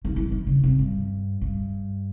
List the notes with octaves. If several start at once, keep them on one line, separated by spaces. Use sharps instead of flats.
D#3
E3
D#3
C#3
C3
G2
G2